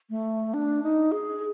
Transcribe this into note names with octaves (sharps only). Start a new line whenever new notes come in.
A3
D4
D#4
G#4